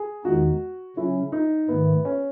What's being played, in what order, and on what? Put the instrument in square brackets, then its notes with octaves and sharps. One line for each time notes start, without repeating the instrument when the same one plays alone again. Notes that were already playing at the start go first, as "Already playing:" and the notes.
Already playing: [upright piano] G#4
[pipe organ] E2 D#3 G#3 B3 D#4 [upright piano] F#4
[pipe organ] C#3 F#3 C#4 [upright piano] E4
[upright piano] D#4
[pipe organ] G#2 D#3 A3 [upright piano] B3
[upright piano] C#4